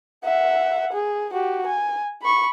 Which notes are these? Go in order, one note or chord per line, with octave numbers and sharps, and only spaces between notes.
E5 F#5
G#4
F#4 G4
G#5
B5 C#6